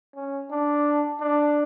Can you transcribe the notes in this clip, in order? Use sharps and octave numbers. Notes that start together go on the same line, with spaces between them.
C#4
D4
D4